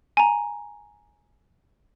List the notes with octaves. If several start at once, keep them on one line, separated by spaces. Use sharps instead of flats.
G#5 A#5